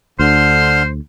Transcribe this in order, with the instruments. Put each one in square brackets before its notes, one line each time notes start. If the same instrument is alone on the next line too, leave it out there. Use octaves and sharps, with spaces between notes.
[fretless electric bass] D2 [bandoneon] D3 C6 F6 [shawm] C5